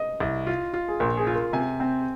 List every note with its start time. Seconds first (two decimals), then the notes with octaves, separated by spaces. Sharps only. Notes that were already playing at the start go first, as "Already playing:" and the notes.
Already playing: D#5
0.20 C2
0.47 F4
0.74 F4
0.88 G#4
1.00 A#1 A#4
1.17 G#4
1.27 F4
1.35 A#4
1.53 C3 G#5
1.80 C4